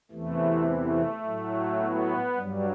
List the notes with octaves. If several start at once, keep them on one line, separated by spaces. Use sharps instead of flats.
E2 C3 E3 A3
A3
A2 F#3
B3
G2 F#3 G3